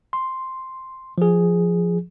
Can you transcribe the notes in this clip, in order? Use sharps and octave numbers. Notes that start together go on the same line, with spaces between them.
C6
F3 G#4